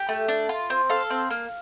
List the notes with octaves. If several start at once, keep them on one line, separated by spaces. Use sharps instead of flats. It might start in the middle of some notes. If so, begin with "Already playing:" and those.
Already playing: G4
A3
D4
F4
C4
A4 F5
C4
A#3